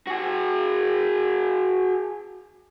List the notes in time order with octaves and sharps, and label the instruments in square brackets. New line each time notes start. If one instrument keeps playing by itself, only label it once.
[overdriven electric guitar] F#4 G#4